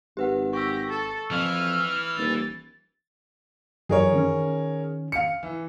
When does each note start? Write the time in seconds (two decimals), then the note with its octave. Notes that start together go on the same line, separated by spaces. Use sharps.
0.17 G#1 G4 B4 F#5
0.53 G4 C#6 E6 A#6
0.89 A4
1.31 F2 E3 F6
2.17 D#1 A6
3.89 F#2 E3 G#4 A#4 C#5
4.13 D#3 C#4
5.12 F5 C#7
5.43 E3